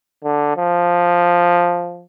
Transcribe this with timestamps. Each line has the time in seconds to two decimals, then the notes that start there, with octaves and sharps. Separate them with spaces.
0.24 D3
0.57 F3